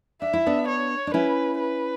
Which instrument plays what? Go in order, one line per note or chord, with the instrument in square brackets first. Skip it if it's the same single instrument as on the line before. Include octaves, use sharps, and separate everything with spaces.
[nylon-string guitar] D4 [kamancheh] E5
[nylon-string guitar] E4
B3 D4
[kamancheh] C#5
[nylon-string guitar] D4
[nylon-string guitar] C#4 E4 [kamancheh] B4
[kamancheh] B4